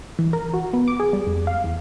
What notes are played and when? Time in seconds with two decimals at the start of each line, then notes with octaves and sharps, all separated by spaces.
0.19 E3
0.33 A#4
0.53 F#4
0.73 B3
0.88 D6
1.00 G#4
1.13 G3
1.27 F2
1.47 F5
1.64 E2